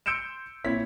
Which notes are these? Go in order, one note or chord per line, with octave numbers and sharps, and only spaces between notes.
C6 E6 G6 C#7 D7 E7
A#2 C4 E4 C#5 B6